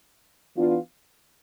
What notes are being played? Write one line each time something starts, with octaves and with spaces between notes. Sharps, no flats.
E3 B3 D4 F4